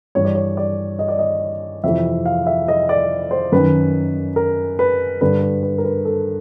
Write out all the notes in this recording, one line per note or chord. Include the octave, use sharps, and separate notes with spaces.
G2 E3 C#5
D5
C#5
D5
D#5
D5
D#5
F2 C3 E3 E5
F5
E5
D#5
D5
C5
F#2 D#3 B4
A#4
B4
G2 D3 B4
B4
B4
A#4
B4
A4